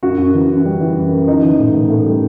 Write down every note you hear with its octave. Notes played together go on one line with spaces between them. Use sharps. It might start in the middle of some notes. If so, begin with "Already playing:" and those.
F#2 F#4
F#2
E3
F#2
G3
E3
F#2
F#2
E3 D#4
E3
A2
A2
A2
G3